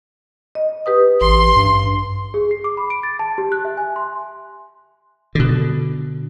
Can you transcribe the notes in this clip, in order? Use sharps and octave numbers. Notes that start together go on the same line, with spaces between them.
D#5
G4 B4 D#6
A1 C6
G2
G#4
C7
D6
B5
D7
A6
A5
G4
F#6
E5
G#5
C6
B2 D3